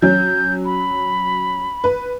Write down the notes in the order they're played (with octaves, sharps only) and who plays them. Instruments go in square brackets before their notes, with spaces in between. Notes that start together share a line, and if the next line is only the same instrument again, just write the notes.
[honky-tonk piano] F#3 C#4 [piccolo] G6
[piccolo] B5
[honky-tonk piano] B4